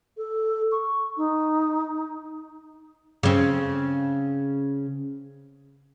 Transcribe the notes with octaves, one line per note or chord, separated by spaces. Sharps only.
A4
C#6
D#4
C#3 C4